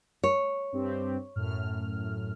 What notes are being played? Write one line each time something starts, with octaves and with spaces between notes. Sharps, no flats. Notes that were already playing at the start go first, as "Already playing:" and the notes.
C#5
G2 C4 G4
F#2 A2 F6